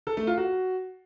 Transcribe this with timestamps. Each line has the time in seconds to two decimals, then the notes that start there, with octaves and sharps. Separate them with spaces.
0.07 A4
0.17 A3
0.27 F4
0.37 F#4